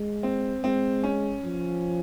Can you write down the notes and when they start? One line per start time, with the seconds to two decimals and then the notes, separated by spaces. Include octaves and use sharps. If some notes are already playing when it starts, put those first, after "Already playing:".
Already playing: G#3
0.23 C4
0.63 G#3 C4
1.03 C#4
1.44 F3